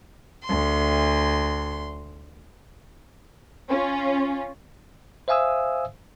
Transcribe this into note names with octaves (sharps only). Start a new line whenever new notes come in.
D2 C6
C#4 F4
C5 E5 F5 G#5 D#6 E6